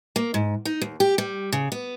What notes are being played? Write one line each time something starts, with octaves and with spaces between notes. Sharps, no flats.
A#3
G#2
D#4
D#2
G4
G3
C#3
B3